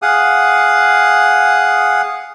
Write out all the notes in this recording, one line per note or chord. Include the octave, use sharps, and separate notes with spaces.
G#4 F5 F#5 D#6